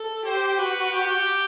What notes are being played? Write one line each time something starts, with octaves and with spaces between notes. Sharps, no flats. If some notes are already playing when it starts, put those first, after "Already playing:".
Already playing: A4
G4 C5
F#4 B4
G4